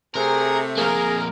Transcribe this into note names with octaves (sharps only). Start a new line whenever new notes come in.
C3 A3 G#4 A#4
F2 A#3 G#4 A#4